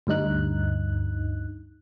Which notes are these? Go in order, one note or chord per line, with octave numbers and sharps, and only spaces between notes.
D2 G2 D#4 F#6